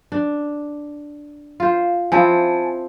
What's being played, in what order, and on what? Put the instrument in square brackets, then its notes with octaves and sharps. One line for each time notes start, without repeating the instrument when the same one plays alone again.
[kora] D4
F4 C5
[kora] F3 C4 E4 [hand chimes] G#5 A5